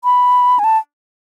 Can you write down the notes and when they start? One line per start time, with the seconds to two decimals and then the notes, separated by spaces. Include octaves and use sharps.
0.04 B5
0.59 G#5
0.64 A5